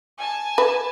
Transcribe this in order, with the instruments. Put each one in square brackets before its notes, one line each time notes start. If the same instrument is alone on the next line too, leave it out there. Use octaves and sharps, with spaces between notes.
[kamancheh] G#5 A5
[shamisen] B4